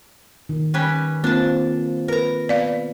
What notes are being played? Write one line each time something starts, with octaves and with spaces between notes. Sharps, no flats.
D#3
G3 C#4 B4
A#3 C4 D4 F4 A5
A#4 B4 A#5
B3 D5 F5